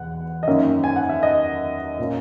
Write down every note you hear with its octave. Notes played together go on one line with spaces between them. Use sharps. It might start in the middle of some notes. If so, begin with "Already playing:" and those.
Already playing: E2 B2 F#5
D#5
F#2 D#3 A#3 C#4 E5
G#5
F#5
E5
D#5
A#2 A#3 C#4